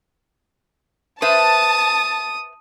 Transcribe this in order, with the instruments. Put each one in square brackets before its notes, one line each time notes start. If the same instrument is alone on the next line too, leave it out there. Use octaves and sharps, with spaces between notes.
[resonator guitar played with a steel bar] B4 C5 E5 [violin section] A5 [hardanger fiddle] D#6